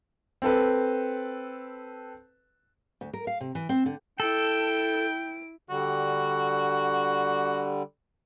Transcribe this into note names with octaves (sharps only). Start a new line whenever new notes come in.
C4 A4 B4
D2
A#4
F5
C3
E3
C4
D3
E4 A4 G5 D7
D3 G3 F#4